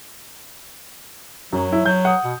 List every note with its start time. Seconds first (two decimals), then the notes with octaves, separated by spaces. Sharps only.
1.53 F#2 F#3
1.73 E4
1.85 F#3 G6
2.05 F#5 D#6
2.24 B2